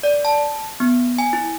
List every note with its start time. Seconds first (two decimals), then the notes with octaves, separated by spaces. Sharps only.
0.03 D5
0.25 A5
0.80 B3
1.18 G#5
1.33 E4